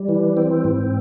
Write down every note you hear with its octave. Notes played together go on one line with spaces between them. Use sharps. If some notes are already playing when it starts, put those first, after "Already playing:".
Already playing: G3
E3
C4
G#2